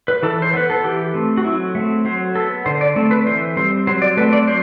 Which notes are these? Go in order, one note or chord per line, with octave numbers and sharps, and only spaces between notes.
B4
E3 A4
C5
B3 B4
A4
E3 G4
A3 C4
F#4
F#3 E4
A3 C4
F#3 C5
B3 A4
D3 C5
D5
A3 C4
B4
E3 C5
G3 C4 C5
F#3 C5
D5
A3 C4 B4
D5
F#3 C5